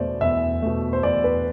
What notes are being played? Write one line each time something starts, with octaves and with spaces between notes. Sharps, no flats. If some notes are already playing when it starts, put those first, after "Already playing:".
Already playing: E2 B2 A3 C5 D5
E2 E5
B2 A3
C5
E2 D5
B4